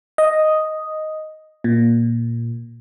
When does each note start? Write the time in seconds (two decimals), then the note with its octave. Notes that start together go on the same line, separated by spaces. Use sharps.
0.18 D#5
1.64 A#2